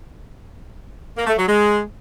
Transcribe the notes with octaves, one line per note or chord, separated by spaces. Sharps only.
A#3
A3
F#3
G#3